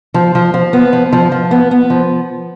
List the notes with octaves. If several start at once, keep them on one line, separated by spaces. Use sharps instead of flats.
F3
F3
F3
B3
F3
F3
F3
B3
B3
F3